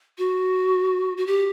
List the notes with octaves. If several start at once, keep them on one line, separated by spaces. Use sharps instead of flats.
F#4
F#4
G4